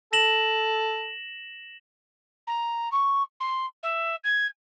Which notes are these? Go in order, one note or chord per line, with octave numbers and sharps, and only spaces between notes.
A4 A#6 E7 F#7
A#5
C#6
C6
E5
G#6